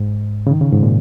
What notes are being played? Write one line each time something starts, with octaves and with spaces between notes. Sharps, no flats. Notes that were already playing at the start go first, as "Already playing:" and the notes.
Already playing: G#2
C#3
D#3
C#3
G#2
A#2